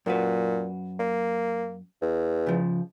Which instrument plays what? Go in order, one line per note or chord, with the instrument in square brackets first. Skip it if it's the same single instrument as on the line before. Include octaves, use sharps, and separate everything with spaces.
[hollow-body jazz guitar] F#2 F#4 B4 [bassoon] A#2
[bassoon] A#3
E2
[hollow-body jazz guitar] C#3 F3